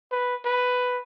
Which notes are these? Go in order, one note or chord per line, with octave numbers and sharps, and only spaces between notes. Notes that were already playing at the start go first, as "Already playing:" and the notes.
B4
B4